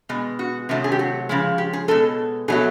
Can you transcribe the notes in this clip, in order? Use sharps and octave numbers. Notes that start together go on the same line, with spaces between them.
B2 G#3
F#4
C3 D#3 F#3 A3
G#4
G4
F#4
C#3 F3 G#3
G4
G#4
B2 G#3 A4
B2 F#3 A3 G#4